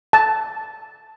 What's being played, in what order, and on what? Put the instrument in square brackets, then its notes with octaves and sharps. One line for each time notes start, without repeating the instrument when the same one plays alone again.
[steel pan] A5